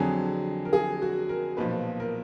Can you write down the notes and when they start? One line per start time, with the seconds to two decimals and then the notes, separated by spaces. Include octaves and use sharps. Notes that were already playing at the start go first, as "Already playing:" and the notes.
Already playing: F2 D3 F#3 G#4
0.65 A#4
0.73 G#4
1.02 F#4
1.29 A#4
1.57 B1 A#2 F3 B4
2.00 A#4